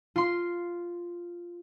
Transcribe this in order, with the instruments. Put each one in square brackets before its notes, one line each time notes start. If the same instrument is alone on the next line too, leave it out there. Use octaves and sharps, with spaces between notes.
[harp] F4 C6